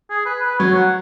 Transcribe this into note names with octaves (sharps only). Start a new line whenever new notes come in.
G#4
B4
B4
F#3 C#5
F#5